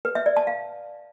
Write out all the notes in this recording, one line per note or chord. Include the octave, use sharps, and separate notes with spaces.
B4
E5
D5
A5
F5